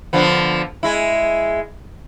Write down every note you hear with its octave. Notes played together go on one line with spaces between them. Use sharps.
D3 F3 B3
G#3 E4